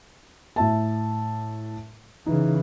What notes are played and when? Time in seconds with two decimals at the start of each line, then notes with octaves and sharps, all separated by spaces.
0.56 A2 E5 A5
2.26 C#3 E3 D#4